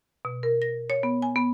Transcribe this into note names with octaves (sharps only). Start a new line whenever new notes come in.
B2
A#4
A#6
C#5
B3
G#5
B3